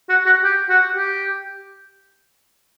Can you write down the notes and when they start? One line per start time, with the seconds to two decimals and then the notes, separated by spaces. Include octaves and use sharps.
0.09 F#4
0.26 F#4
0.44 G4
0.69 F#4
0.95 G4